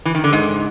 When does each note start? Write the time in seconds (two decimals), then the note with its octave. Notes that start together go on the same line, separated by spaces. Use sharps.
0.05 E3
0.15 D#3
0.24 D3
0.32 G#2